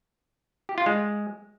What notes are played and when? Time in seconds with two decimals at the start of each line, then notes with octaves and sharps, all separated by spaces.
0.69 G4
0.78 F4
0.86 G#3